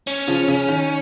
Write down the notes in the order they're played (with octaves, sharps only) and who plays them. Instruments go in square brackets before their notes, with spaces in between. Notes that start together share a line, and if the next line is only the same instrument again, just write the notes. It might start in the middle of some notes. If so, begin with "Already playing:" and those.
[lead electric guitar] C#4
[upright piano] C#3 F3
C#3
D#3